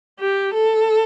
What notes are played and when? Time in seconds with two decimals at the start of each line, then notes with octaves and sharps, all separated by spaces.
0.20 G4
0.54 A4